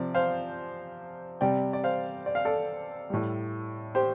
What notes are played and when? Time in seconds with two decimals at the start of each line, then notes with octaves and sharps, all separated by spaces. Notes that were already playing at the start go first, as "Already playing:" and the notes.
Already playing: C3 F3 D5
0.14 C5 F5
1.41 C3 G3 D5 G5
1.73 D5
1.84 C5 F5
2.26 D5
2.35 F5
2.45 A4 D5
3.10 A2 G3
3.95 G4 C5